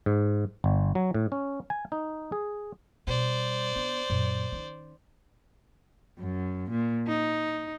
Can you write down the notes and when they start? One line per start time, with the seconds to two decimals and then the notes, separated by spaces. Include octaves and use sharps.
0.06 G#2
0.64 G1
0.95 F#3
1.14 A2
1.32 C#4
1.70 G#5
1.92 D#4
2.32 G#4
3.07 B2 G3 C5 D5
3.76 B3 D4
4.10 F#2 A#2
4.52 D#3 C#4
6.19 F#2
6.70 A#2
7.07 D#4